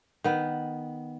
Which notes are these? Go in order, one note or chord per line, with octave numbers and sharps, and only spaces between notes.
D#3 B3